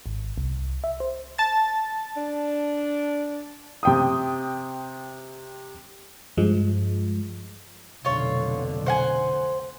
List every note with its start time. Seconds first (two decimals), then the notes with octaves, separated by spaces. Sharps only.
0.06 G#1
0.38 C2
0.84 E5
1.00 C5
1.38 A5 A6
2.17 D4
3.83 C3 G5 D#6
6.38 G2 F3 G#3
8.05 F1 B1 D3 F4 C#5
8.86 C5 F#5 G#5